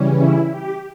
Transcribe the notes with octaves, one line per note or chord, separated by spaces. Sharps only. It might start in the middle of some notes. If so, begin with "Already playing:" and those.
Already playing: C#3 E3 G3 C#4
E4
G4